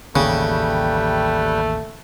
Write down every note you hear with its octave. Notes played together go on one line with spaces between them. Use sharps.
A1 D#2 C#3 G3 A3 B4 G5